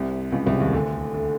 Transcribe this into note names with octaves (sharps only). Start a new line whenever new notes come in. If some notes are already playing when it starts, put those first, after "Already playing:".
Already playing: C2 C3
C#2 C#3
C2 C3
D#2 D#3
D2 D3
D3